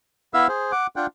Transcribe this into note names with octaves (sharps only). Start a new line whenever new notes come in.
B3 E4 E5 F5 E6
G#4 C5
F#5 D6
D4 F4 F#5 G5